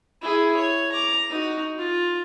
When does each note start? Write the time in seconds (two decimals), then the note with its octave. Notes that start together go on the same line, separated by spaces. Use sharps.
0.22 E4 G#4
0.57 C#5
0.92 A#5 D6
1.30 D#4 F#4
1.78 F4